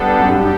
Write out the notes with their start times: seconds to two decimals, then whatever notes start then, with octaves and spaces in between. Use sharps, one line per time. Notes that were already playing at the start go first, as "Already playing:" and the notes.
Already playing: G3 B3 D4 A4
0.18 F#2
0.28 G2 G4